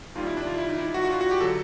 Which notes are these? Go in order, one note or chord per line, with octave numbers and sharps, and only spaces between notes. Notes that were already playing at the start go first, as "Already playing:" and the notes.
D#2 D#3 G3 F4
E4
D4
F4
E4
D#4
E4
F#4
F#4
F4
F#4
G4
D3 F#3 A4